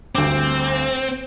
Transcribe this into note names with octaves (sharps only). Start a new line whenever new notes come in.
D2 G2 C4 D6